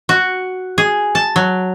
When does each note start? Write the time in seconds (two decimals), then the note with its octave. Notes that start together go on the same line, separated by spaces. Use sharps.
0.09 F#4
0.78 G#4
1.15 A5
1.36 F#3